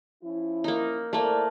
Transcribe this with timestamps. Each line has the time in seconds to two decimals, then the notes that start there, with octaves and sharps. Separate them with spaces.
0.24 F3 C#4 E4
0.64 A#3 D#4
1.13 A3 A#3 E4 C5 D5